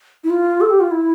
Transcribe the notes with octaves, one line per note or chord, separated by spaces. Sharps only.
E4
F4
A4
G4
F4
E4